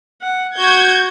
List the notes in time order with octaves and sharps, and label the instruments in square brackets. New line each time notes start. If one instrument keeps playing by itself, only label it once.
[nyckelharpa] F#5
[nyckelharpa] F#4 [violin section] G6 G#6